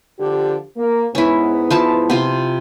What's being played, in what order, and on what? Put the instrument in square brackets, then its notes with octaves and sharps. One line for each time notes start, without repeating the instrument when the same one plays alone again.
[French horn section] D3 F3 G4
A#3
[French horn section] G#2 B3 [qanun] C#4 E4
[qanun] F3 E4 A5
C3 F4